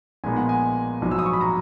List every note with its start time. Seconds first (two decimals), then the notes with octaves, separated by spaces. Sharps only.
0.24 A#1 A#2 G#3 B3 D#4 G#5
0.37 F#5
0.49 G#5
1.01 A#1 G#2 F#3
1.11 E6
1.19 D#6
1.26 C#6
1.33 B5
1.41 A#5